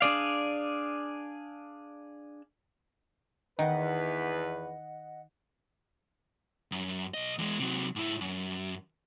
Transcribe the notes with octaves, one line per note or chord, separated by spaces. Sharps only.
D4 G#4 D5 F5
E2 D#3 B4 D#5 F#5
F#2
B1 D#5
E2 G#3
C3 F#3
G#2 E4
F#2